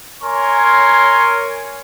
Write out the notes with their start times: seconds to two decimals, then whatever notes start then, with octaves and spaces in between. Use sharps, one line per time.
0.22 A#4 C#5 G#5 C6